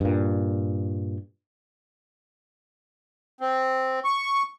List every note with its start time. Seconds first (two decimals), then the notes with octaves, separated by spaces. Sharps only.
0.01 G2 A#2
3.41 C4
4.05 C#6